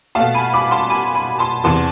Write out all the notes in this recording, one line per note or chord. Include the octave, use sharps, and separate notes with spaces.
B2 A3 F5 A5
G#5 B5
B5 D6
A5 C6
G#5 B5
G#5 B5
A5 C6
E2 C3 E3 B3 A5 C6